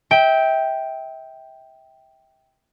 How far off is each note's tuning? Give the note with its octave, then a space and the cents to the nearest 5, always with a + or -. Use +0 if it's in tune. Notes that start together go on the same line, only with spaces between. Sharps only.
E5 -30 G5 +0